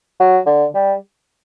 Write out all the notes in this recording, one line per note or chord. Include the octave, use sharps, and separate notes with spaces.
F#3
D3
G3